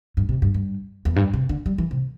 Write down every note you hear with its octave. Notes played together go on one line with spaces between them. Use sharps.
G2
C3
G2
G2
E2
G2
C3
D3
G3
E3
C3